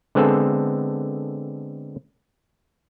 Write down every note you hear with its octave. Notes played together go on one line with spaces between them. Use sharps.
D3 G#3 B3 C4 G#4 A4